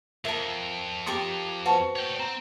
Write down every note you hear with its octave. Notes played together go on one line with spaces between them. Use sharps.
F2 A#4 E5 A#5 F#7
G4 A#4 C6 D#6 A6
F#4 B4 C5 F#5 A5 C#6
C#5 G5
C4 A#5